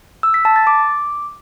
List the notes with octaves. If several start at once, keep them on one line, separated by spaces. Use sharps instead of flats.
E6
B6
A5
A6
D6